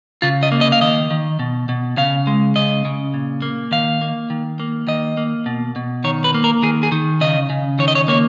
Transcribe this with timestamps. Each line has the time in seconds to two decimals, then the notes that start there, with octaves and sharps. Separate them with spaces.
0.22 C#3 F4
0.43 D#5
0.52 A#3
0.61 D#5
0.72 F5
0.81 D#3 D#5
1.11 D#3
1.39 B2
1.69 B2
1.97 C#3 F5
2.27 G#3
2.56 C#3 D#5
2.85 C#3
3.14 A#2
3.42 A#3
3.71 D#3 F5
4.02 A#3
4.30 D#3
4.60 A#3
4.87 D#3 D#5
5.17 A#3
5.46 B2
5.76 B2
6.04 D#3 C#5
6.24 B4
6.34 A#3
6.44 A#4
6.62 D#3 G#4
6.83 G#4
6.92 D#3
7.21 C#3 D#5
7.50 C#3
7.79 D#3 C#5
7.88 D#5
7.95 C#5
8.08 A#3 C#5